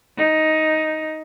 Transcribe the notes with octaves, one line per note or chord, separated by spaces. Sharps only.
D#4